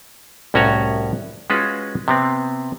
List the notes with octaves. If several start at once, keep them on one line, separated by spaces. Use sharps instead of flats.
C2 A2 C#4 F#4 G#5 A#5
G#3 C#4 F4 F#4 B4
C3 B3 C4